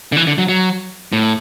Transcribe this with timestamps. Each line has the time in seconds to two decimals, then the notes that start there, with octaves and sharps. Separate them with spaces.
0.12 D3
0.17 E3
0.27 D3
0.38 F#3
0.49 F#3
1.12 A2